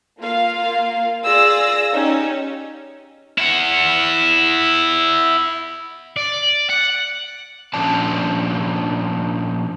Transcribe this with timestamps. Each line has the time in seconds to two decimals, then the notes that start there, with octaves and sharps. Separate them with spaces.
0.20 A#3 F4 F5
1.23 F4 G#4 D5 E6 A#6
1.93 C#4 D#4 G4
3.38 E4 F#5
6.16 D5
6.70 F#5
7.74 A#2 F3 C#4 D4 D5 A5